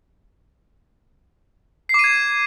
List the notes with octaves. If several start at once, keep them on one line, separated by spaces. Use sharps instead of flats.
D6 G#6 C7 D#7